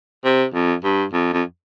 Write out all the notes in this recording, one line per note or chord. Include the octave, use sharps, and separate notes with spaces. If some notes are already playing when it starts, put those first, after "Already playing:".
C3
F2
G2
F2
F2